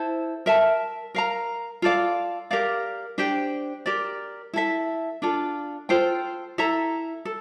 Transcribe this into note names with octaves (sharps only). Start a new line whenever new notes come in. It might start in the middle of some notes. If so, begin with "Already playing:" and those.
Already playing: E4 A4 C5
A#4 E5 A5
A#4 F5 A#5
F4 A4 D5 F5
G4 A#4 D5 F5
D4 G4 C5 G5
G4 A#4 D5
E4 A4 E5
D4 F4 A4
F4 A4 C5 G5
E4 A4 E5 A#5
A4